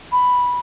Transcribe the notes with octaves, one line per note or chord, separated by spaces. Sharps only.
B5